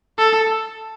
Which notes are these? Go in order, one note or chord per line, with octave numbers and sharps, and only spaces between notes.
A4